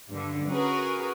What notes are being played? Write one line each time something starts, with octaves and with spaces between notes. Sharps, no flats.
G2 D3
C#4 F#4 G#4 A#4 B4